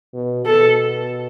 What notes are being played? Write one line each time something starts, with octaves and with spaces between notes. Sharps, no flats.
B2
B2 A4